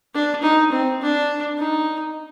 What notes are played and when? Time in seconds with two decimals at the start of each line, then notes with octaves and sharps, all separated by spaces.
0.14 D4
0.43 D#4
0.72 C4
1.02 D4
1.58 D#4